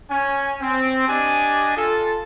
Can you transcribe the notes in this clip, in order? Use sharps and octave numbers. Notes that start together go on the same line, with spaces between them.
C#4 G#5
C4
D4 G4 D#5 G#5
F4 A4